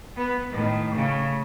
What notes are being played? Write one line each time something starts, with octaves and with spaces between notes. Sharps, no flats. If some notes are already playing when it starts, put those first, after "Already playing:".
B3
A2 D#3
C#3 A3